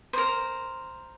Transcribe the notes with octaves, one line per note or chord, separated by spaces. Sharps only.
A#4 C5